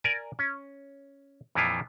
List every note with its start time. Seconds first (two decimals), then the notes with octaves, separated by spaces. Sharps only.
0.04 A#4 D5 G#5
0.39 C#4
1.55 F2 A#2 E3 F3 E4 F4